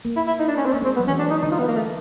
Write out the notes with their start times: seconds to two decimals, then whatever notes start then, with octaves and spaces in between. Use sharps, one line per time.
0.05 A#3
0.16 E4
0.27 E4
0.39 D#4
0.48 D4
0.57 C#4
0.66 C4
0.73 A#3 C#4
0.82 G#3
0.85 C4
0.96 B3
0.99 F#3
1.08 E3 C#4
1.19 D4
1.31 D#4
1.42 D3 D#4
1.51 F4
1.59 B3
1.68 A#3
1.77 A3